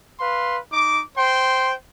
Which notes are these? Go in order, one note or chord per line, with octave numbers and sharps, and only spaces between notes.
B4 F5 C6
D#4 D6
C5 G5 C6